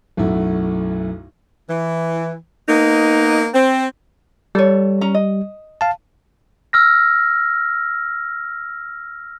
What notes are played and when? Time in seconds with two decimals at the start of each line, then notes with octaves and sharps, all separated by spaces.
0.17 B1 F#2 A3 E4 F#4
1.69 E3
2.68 A#3 B3 D#4
3.54 C4
4.55 G3 A4 C#5
5.01 C#4 A#5
5.14 D#5
5.81 F5 A5
6.73 E6 F6 A#6